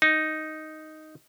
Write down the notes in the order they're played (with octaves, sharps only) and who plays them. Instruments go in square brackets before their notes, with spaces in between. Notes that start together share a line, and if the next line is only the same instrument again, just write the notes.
[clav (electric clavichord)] D#4